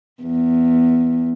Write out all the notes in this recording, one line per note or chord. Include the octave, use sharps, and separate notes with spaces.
E2